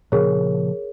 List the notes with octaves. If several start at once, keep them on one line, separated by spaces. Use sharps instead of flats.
A#2 C#3 F3 G#4 A#4 C#5